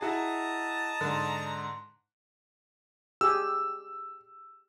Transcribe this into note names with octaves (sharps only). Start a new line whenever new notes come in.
E4 F#4 G#4 D#5 A5 A#5
G#2 D3
G4 G#4 E6